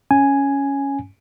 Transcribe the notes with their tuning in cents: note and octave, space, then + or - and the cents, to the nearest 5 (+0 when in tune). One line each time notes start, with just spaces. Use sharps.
C#4 +0 G#5 +0